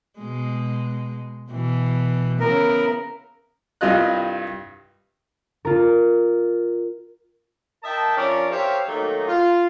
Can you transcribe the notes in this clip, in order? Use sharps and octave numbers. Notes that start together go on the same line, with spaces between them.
B2 G#3
B2 E3
C#3 B3 E4 A#4
C2 G2 G3 F4 D#5 F#6
F4 A#4
A#4 D#5 E5 G5 A5
F3 C#4 D4 A#4 D5 E5
G4 A#4 C5 C#5 E5 F5
D#3 F#3 A3 A#3 D#4
F4